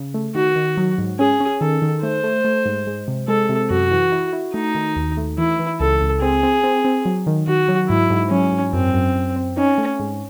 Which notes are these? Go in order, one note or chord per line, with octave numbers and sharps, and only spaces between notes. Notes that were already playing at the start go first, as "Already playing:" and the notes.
Already playing: C#3
A3
D#3 F#4
D#3
F#3
G#2
C#4 G#4
C#4
D#3 A4
D#3
A3 C5
A3
A3
G#2
G#3
C3
G#3 A4
C3
F#2 F#4
E3
E4
E4
A3 D#4
D#3
D#2
A3
E3 E4
E3
C#2 A4
C#2
C4 G#4
C4
C4
C4
F#3
D#3
D#3 F#4
F#3
G#2 E4
G#2
F#3 C#4
G#2
F#2 C4
F#2
F#2
C4
C#4 D#4
A3
G#2